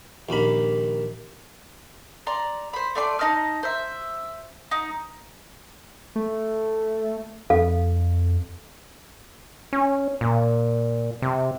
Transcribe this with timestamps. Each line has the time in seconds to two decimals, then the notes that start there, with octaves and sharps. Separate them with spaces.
0.29 A#1 D#2 A#3 B5
2.27 D5 A#5 C6
2.73 C5 B5
2.95 A3 D5 C6
3.19 D#4 D#5 A5 F6
3.63 C5 E5
4.71 D#4
6.16 A3
7.50 F2 A4 F5
9.73 C#4
10.21 A#2
11.22 C3